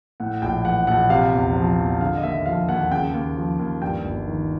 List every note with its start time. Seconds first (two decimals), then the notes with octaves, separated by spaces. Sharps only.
0.20 A2 F#5
0.42 A#1 G5
0.65 E3 F#5
0.87 A#1 F#5
1.10 C3 F5
1.33 E2
1.56 F3
1.78 E2
2.01 D3 F5
2.17 D#5
2.23 D#2 E5
2.46 F3 F5
2.69 D#2 F#5
2.91 C#3 G5
3.14 D#2
3.36 F3
3.59 D#2
3.82 G2 G5
4.05 G1
4.27 D#3